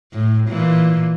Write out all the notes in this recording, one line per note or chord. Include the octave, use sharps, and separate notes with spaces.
A2
A#2 E3